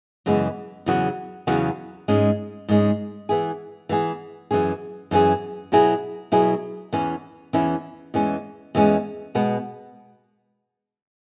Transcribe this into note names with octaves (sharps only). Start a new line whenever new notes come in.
F#2 C#3 E3 G#3 B3
E2 C#3 F#3 B3 F#4
E2 C#3 F#3 B3 F#4
G#2 G#3 C#4
G#2 G#3 C#4
E3 B3 E4 G#4
E3 B3 E4 G#4
F#2 E3 C#4 G#4
F#2 E3 C#4 G#4
B2 F#3 E4 G#4
B2 F#3 E4 G#4
E2 E3 C#4 E4
E2 E3 C#4 E4
E2 E3 G#3 C#4
E2 E3 G#3 C#4
B2 G#3 B3